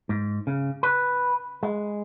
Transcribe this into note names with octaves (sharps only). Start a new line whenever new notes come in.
G#2
C#3
B4
G#3